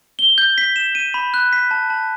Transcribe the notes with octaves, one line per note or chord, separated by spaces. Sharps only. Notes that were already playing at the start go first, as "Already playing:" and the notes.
G7
G6
B6
E7
D#7
B5
F#6
B6
A5
A5